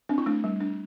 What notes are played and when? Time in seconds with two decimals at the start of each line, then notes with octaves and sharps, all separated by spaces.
0.09 C4 D4
0.18 E4
0.26 A3 D4
0.44 G3
0.61 D4